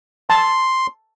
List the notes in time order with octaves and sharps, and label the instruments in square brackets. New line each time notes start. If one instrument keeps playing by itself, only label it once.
[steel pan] A5 [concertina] C6